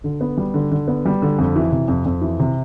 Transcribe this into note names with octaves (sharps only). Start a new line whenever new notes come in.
D3
B3
G3
D3
D3
B3
G3
D3
F2
E3
C3
F2
F2
E3
C3